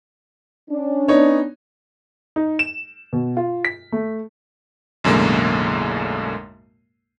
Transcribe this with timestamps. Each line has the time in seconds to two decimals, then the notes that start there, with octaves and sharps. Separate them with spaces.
0.70 C#4 D4
1.08 B3 D#4 C#5
2.36 D#4
2.59 E7
3.13 B2
3.37 F4
3.65 B6
3.92 A3
5.04 B1 F#2 A2 D3 G#3 A#3